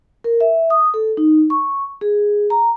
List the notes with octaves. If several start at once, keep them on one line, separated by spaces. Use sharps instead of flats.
A#4
E5
D#6
A4
D#4
C#6
G#4
A#5